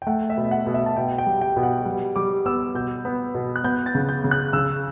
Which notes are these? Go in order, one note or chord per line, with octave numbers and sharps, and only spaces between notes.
G5
A3 F#5
E5
B2
F#5
B2
E5
A5
B2 G5
G5
G3
G5
B2
F#5
G3
G3 D6
B3 E6
B2 G6
B3
B2
F#6
B3 G6
A6
C#3
G6
C#3
F#6
C#3 E6